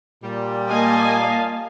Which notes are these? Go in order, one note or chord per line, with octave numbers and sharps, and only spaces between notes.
A#2 G3
A#3 D#5 F5 G#5 A5